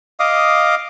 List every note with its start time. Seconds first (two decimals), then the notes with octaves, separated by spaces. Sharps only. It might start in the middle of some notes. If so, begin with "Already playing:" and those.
0.20 D#5 F5 D6 D#6